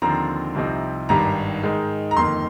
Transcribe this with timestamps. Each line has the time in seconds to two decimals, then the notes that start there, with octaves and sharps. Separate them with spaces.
0.02 D#2 D3 F3 C4 A#5
0.55 C2 C3 F3 C4 D#4
1.09 G#1 G2 D#3 G3 A#5
1.63 G#2 D#3 G#3
2.11 A#5
2.17 G1 F2 D#3 A#3 C6